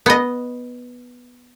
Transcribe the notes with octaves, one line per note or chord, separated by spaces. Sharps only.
B3 D#5